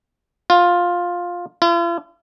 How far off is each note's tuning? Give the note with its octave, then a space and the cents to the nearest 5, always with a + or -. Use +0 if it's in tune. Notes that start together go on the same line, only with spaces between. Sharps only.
F4 +10
F4 -45